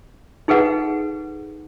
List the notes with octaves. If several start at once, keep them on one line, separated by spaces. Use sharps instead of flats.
D#4 G#4 A4 B4 F#5